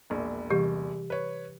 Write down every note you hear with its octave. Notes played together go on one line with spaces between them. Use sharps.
E1 A#1
C3 E3 G3 G4
B4 C#5